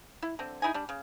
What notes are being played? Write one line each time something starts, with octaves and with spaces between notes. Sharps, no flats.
E4
D3 C4
D#4 E4 G#4 G#5
G3 D4
C#3